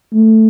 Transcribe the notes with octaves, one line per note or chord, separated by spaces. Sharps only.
A3